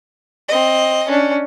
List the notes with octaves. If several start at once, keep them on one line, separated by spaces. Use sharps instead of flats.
C4 D#5
C#4 D4